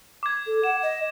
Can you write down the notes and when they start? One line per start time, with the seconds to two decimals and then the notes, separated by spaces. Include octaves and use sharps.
0.23 D6 G#6
0.47 A4
0.64 F#5 E7
0.83 D#5